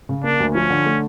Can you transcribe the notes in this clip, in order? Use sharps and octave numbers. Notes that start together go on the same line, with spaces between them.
C#3
A#3 D4
D2
F3 C#4
D3
A3